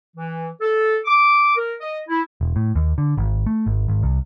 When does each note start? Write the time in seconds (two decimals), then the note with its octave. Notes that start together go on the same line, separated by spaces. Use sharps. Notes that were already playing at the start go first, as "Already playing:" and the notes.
0.16 E3
0.61 A4
1.05 D6
1.56 A#4
1.80 D#5
2.08 E4
2.41 E1
2.56 A2
2.75 D#2
2.98 D3
3.17 G#1
3.46 A3
3.66 G#1
3.88 G#1
4.03 C2